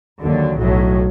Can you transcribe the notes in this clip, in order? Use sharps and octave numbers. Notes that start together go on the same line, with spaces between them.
D#2 D3 F#3
B1 A2 F#3